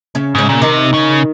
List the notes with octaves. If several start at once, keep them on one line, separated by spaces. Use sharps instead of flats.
C#3 C#4
G#2 C#3 C#4
A#2
C3 D#3 D#4
C#3